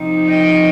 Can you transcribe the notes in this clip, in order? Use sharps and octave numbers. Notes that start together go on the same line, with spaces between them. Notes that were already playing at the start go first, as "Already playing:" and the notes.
Already playing: C3 F3 C4 D#4
D#5 G5